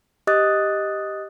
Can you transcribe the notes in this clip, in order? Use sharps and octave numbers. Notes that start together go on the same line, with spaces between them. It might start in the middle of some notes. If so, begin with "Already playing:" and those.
G4 D#5 D6 D#6 F#6 A6